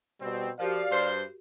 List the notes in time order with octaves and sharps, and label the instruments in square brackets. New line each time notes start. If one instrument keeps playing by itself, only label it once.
[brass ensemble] B2 G3 C4
[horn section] F3 [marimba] F#4 G4 A#4 [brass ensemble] D5 F5
[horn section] G2 C5 C6